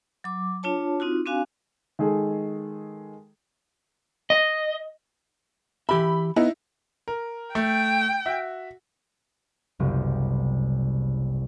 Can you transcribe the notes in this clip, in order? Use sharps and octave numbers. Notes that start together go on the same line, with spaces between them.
F#3 D6
D4 F4 C#5 A5
C4 D#4 F4 F#4
C4 D4 F#4 F5 G#5
D#3 G#3 G#4 A4
D#5
E3 G4 E5 B5
B3 D#4 E4
A#4
A3 G5
F#4 E5
F#1 C2 C3 B3 F5 G5